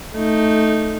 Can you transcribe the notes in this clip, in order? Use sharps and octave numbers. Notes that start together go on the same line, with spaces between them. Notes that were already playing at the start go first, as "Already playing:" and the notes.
A3 D#4